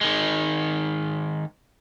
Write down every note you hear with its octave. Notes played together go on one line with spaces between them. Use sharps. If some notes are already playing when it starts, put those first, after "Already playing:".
D#3 G#3